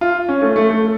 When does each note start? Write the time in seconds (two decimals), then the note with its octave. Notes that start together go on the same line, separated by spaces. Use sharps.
0.01 F4
0.29 C#4
0.42 A3
0.56 A3
0.69 A3